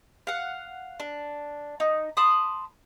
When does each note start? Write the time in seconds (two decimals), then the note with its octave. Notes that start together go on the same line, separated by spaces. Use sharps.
0.27 F5 F#5
1.00 D4
1.80 D#4
2.17 A5 B5 C6 D#6